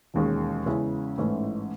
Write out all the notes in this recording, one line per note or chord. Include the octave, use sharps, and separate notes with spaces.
E1 D#2 D#3 G#3 C#4
E2 C#3 G#3 C#4 E4
A1 G#2 E3 A3 C#4